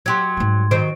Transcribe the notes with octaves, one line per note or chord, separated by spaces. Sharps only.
F#3 G4 C6 G#6
G#2 G3
D#3 F#3 C5 D7